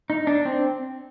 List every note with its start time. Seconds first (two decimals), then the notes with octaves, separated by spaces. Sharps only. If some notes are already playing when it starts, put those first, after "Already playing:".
0.10 D#4
0.27 D4
0.46 C4